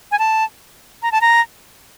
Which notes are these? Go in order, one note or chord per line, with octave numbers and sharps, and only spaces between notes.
G#5
A5
A#5
A5
A#5